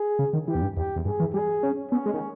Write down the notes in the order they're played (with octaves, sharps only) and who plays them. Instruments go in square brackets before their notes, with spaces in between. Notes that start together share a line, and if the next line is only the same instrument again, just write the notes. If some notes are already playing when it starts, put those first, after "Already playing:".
Already playing: [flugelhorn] G#4
[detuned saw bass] C#3
D#3
[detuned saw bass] E3 [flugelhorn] G4
[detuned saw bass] E2
G2
[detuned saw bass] E2 [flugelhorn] G4
[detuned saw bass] E2
[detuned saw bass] G2 [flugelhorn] G#4
[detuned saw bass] E3
[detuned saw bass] G3 [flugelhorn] G#4
[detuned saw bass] C#4
[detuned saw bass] B3 [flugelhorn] C#4
[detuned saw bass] G#3
D#3